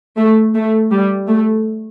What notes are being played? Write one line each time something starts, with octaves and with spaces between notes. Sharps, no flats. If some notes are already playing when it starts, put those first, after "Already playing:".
A3
A3
G3
A3